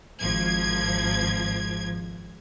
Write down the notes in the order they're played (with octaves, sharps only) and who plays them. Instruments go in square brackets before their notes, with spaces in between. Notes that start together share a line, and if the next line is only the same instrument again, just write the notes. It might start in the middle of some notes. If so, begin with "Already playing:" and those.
[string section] G#1 F3 G#6